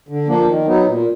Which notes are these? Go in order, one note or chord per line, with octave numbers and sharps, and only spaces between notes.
D3
F3 A#3 D4
D#3
F#3 B3 D#4
A#2